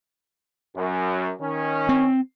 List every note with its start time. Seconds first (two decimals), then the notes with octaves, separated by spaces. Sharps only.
0.76 F#2
1.40 D#3 C#4
1.89 C4